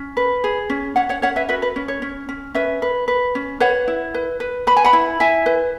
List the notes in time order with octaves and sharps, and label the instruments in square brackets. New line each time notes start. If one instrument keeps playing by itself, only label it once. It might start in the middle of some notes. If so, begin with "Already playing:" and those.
Already playing: [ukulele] C#4
B4
G#4
C#4
C#4 C#5 F#5
C#5 F#5
C#4 C#5 F#5
B4 E5
F#4 B4 E5
B4
C#4
C#5
C#4
C#4
C#4 B4 E5
B4
B4
C#4
B4 C#5 F#5
E4
B4
B4
B4 B5
G#5
F#5 B5
E4
E4 E5 G#5
B4